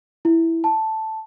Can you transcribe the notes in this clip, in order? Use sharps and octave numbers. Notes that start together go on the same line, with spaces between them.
E4
A5